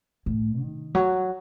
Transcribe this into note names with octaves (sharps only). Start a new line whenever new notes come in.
A2
D#3
F#3